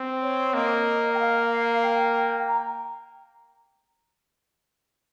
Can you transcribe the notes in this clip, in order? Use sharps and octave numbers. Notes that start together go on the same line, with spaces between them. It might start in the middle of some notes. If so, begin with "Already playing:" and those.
Already playing: C4
C#5
A#3 D#5
G5
F5
G5
A#5